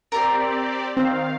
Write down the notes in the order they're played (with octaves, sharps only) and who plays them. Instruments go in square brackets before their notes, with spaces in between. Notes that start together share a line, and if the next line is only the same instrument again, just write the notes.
[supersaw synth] C4 G4 D5 [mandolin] A#4 A#5 C6
[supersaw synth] D#3 F5 [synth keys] C4